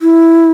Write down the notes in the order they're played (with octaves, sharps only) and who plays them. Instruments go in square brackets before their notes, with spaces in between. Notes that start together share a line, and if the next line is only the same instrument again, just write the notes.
[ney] E4